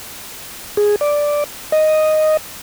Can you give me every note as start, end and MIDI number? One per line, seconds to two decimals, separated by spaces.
0.77 0.96 68
1.01 1.44 74
1.72 2.37 75